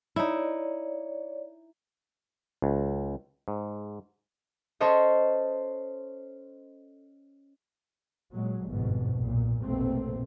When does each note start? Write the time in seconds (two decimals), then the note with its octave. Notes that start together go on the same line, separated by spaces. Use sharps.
0.16 D#4 E4 C#5 D5
2.62 C#2
3.48 G#2
4.80 C#4 A4 C5 C#5 D#5
8.34 A#2 F#3 G#3
8.67 G1 F2 G#2 B2
9.18 B1 A#2
9.65 F1 A#1 B2 A3 A#3 C4